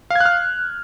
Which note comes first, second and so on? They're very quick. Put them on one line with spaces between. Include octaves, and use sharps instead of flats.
F5 G#6 F#6 F6